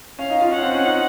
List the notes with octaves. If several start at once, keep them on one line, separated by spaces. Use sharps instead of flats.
C#4 F5
D#4
F4
C#4 F#5
C4
C#4
D#4